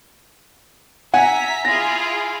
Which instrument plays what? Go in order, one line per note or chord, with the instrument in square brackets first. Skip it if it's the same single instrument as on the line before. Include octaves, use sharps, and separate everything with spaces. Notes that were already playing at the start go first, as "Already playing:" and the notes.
[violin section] E5 A#5 B6 [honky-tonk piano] F#5 G#5
[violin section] E4 F4 G#4 [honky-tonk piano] A#6